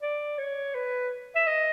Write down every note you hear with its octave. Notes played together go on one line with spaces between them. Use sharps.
D5
C#5
B4
E5
D#5